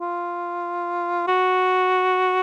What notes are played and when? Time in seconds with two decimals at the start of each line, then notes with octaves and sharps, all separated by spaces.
0.01 F4
1.27 F#4